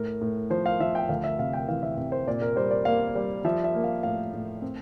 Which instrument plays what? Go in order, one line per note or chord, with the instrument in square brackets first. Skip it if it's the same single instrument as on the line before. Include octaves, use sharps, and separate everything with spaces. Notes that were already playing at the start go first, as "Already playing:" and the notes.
Already playing: [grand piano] A2 A#4
A2
F3 C5
F5
F3 E5
G5
D2 F5
E5
C3 F5
G5
E3 F5
E5
C3
C5
A#2 D5
A#4
G3 C5
D5
A#3 F5
G3
F3 E5
E5
A#3
F5
A2 F5
A2
C4